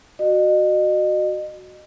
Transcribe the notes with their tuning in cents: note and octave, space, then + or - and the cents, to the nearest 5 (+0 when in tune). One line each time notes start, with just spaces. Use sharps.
F#4 +0 D#5 -35